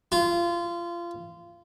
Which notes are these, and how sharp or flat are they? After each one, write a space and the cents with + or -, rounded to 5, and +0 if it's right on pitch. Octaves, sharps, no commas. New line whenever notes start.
F4 -25